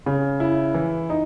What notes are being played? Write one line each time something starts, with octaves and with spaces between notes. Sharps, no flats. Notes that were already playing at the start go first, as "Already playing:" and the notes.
C#3
E4
E3
D#4